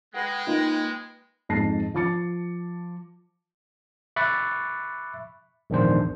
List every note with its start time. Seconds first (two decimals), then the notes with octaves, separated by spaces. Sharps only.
0.14 G#3 B4 F#5 G5
0.47 A#3 D#4 F4
1.49 F2 G#2 A5 A#6 C7
1.94 F3 A5 D6 A6 C#7
4.16 E5 B5 C#6 D6 F#6 A6
5.70 A#1 E2 G#2 D#3 D4 C5